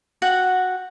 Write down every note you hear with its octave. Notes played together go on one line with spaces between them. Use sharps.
F#4 F#5 G5